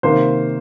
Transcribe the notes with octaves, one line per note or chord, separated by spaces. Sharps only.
C3 D#3 A#3 C5